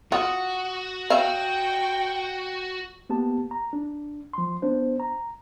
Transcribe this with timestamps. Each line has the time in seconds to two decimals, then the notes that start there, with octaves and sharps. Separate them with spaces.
0.12 F4 F#4 F#5 D#6
1.10 C#5 E5 F5 G5
3.09 A#3 B3 G4 A5
3.51 A#5
3.73 D4
4.33 F3 C6
4.62 B3 D4 C5
5.00 A#5